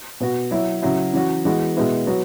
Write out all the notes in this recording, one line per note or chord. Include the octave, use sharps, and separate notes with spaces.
B2 B3 F#4
F#3 E4
C#3 F#3 E4
E3 C#4 F#4
E3 G#3 B3 F#4
B2 G#3 B3 E4
F#3 B3 F#4